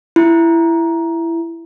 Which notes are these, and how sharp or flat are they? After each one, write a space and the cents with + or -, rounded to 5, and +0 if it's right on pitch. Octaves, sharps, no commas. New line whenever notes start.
E4 +15